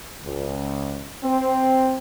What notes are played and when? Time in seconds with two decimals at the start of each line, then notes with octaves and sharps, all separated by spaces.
0.24 C#2
1.23 C4